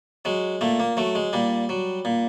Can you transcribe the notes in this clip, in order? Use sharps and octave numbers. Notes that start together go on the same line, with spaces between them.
F#3 G#3
A#2 A3
A#3
F#3 A3
G#3
A#2 G3
F#3
A#2